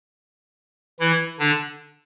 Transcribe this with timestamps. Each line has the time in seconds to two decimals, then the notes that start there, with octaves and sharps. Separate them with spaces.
1.00 E3 E4
1.39 D3 D4